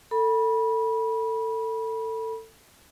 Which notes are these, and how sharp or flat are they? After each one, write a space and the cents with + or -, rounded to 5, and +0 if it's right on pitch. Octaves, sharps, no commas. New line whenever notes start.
A4 +25 B5 -25